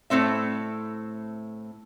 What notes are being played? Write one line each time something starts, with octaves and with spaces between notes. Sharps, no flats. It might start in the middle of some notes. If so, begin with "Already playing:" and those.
A2 A3 C4 E5